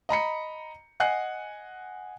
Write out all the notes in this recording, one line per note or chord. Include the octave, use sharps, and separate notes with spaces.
D#5 A#5 B5 C#7
D#5 F#5 G#5 F#6 C7